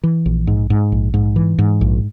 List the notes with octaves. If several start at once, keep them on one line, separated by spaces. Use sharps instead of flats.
E3
A#1
G#2
G#2
A#1
G#2
E3
G#2
A#1